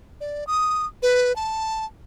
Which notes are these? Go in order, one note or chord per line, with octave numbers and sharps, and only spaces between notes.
D5
D#6
B4
A5